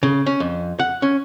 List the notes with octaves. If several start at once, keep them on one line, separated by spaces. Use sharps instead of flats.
C#3
C#4
F2
F#5
C#4